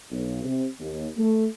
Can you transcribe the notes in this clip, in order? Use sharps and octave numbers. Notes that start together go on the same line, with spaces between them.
B1
C3
D#2
A3